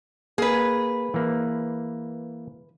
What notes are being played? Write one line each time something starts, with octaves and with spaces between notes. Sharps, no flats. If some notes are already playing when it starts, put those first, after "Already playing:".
A#3 G#4 B4
E3 A#3